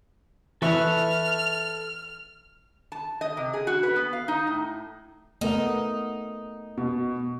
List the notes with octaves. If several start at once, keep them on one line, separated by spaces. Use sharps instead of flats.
E3 A4 B4 E5 C#6 F6
A5
D#5
C3
G#4
F#4
B4
B3
F5
D#4
A2
A3 B3 D#4 A#4
B2